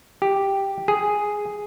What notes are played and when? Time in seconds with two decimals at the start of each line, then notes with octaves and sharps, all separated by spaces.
0.22 G4
0.88 G#4